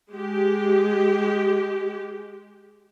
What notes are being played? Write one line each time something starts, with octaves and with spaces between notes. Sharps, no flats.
G#3 G4